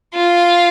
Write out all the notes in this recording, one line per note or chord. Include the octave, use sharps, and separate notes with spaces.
F4